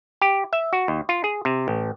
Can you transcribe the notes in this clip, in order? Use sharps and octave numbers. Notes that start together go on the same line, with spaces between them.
G4
E5
F#4
D#2
F4
G#4
C3
A1